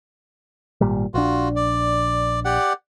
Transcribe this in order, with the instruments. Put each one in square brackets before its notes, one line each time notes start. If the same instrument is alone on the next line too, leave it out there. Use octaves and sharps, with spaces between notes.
[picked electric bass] G#1 A#2 G3
[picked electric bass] A#1 D4 [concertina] F4 F#4
[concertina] D5
G4 D5 F#5